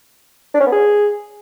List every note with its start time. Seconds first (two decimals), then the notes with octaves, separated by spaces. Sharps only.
0.54 D4
0.60 C#4
0.66 B3
0.72 G#4